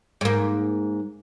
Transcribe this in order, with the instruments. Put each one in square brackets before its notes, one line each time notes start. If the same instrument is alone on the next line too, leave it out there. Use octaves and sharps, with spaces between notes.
[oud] G#2 A#3